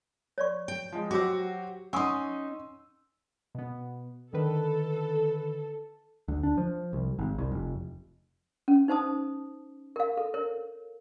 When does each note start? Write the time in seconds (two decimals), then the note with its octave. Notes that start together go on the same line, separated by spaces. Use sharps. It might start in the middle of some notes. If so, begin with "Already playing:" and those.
0.38 C#5 D5 C#6
0.68 G5
0.92 F3 G#3
1.11 F#3 F#4 G4 C5 D6 E6
1.93 C#4 D#4 F#5 G#5 C6 C#6 D#6 E6
3.55 B2 B3
4.33 D3 D#3 A4 B4
6.28 D2
6.43 D4
6.58 F3
6.93 C2
7.19 G#1
7.38 C2
7.52 F1
8.68 C#4
8.88 D#4 C5 A5 D#6
9.96 A#4 F5
10.17 A4
10.34 A#4 C#5